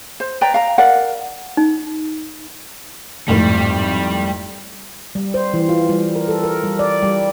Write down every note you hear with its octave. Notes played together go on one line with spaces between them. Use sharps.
C5
B4 D5 G5 A#5
F5 A#5
A#4 D5 F5 F#5
D#4
G#1 F2 A2 G3
G3
C5
E3
F4
G3
A#4
A4
A#4
G3
D5
G3